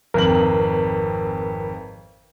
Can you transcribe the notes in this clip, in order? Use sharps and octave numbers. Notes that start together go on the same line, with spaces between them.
G#1 F2 A#4 B4 F#7